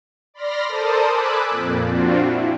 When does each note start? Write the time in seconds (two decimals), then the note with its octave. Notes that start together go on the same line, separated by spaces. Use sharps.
0.34 D5 B5 C6 F6 A#6
0.68 A4 A#4 C5 D5 A5 D#6
1.10 G#5 B5 D6 E6 F#6
1.50 F2 A#2
1.87 C4 D4 F4 F#4
2.20 E4